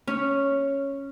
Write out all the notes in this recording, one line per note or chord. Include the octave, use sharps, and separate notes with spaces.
C#4